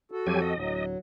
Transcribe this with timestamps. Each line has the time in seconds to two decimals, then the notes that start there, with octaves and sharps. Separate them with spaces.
0.11 F#4 A4
0.27 F2 F#3 G4 G#5
0.42 D#5
0.58 D1 F#3